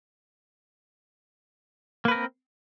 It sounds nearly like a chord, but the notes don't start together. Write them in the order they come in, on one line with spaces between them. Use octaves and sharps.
A#3 B4 A#4 C4